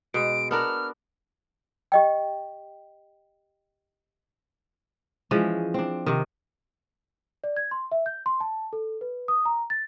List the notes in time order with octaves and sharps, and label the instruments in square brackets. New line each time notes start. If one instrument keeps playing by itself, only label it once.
[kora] B2 G#3 [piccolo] D7
[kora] B3 D4 A#4 [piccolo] F6
[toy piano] G4 D#5 G5
[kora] E3 F3 G#3 C#4
C4 D4
C3 D#3
[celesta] D5
G#6
C6
E5
G6
C6
A5
A4
B4
D#6
A#5
A6